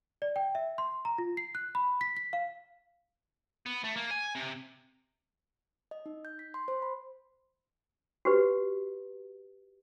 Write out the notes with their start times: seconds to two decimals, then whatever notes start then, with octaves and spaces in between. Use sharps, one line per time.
0.22 D5
0.36 G5
0.55 E5
0.78 C6
1.05 A#5
1.18 F4
1.37 C7
1.55 F#6
1.75 B5
2.01 B6
2.17 B6
2.33 F5
3.66 B3
3.84 A3
3.97 A#3
4.11 G#5
4.35 C3
5.91 D#5
6.06 D#4
6.25 G6
6.39 B6
6.54 C6
6.68 C5
6.82 B5
8.25 F#4 G4 B4